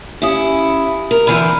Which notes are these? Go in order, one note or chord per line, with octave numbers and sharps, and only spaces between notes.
C#4 E4 G4 F5 D#6
A#4
D3 E3 C4 B5 F6 D#7